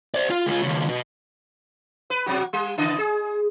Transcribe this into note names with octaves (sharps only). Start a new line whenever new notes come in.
C5 D5
F4 F5
C#2 F4
D#2 C#3
B2
B4
B2 F#3 F#4
G3
C#3 E3 D#5
G#4